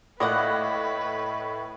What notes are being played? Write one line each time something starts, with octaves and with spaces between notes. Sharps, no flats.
A2 A#3 B4 D5 D#5 F#5 G5 F#6